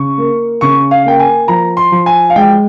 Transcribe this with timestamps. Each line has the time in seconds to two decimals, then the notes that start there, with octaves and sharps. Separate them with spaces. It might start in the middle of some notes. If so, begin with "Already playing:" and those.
Already playing: C#3 C#6
0.18 A#3
0.61 C#3 C#6
0.91 F5
1.06 A#3 G5
1.19 G#5
1.48 F3 A#5
1.77 C6
1.92 F3
2.06 G#5
2.30 F5
2.36 G#3 G5